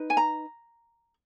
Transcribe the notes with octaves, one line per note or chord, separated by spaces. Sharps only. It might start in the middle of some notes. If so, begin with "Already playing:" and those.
Already playing: D#4 B4
G#5
A#5